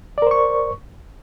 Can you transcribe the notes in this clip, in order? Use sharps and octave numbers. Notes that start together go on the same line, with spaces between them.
A#4 C5 D5 C#6